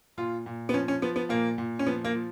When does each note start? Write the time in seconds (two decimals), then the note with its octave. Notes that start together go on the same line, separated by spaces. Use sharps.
0.18 A#2 F4
0.46 A#2
0.69 B3
0.73 F3 C#4
0.88 C#4
1.02 F3 B3
1.16 B3
1.29 A#2 A#3
1.58 A#2
1.79 C#4
1.87 F3 B3
2.05 A#3
2.14 F3